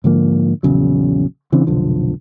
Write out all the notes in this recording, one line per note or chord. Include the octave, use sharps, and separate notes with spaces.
G#2 D3 F3 A#3
A#1 E2 C#3 F#3
C#3 E3 C4 D4
F1 B1 D3 F3